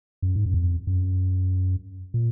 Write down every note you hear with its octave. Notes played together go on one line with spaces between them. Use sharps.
F#2
G#2
F#2
F2
F#2
A#2